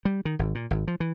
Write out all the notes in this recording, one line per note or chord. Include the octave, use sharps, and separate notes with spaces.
G3
D#3
G#1
A#2
G#1
F3
E3